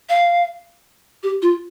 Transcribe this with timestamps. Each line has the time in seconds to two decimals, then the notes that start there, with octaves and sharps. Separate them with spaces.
0.10 F5
1.23 G4
1.42 F4